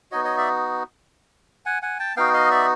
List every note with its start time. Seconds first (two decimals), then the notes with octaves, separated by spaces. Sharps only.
0.12 B3 D#4 F#4 C#5 D#5
0.24 C#5 D#5
0.37 D5 E5
1.66 F#5 G#5
1.82 F#5 G#5
1.99 G5 A5
2.16 B3 D#4 F#4 F5 G5
2.34 D#5 F5
2.51 D5 E5